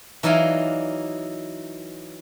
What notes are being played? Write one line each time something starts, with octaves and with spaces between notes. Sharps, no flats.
E3 F#3 D#4 D5 F5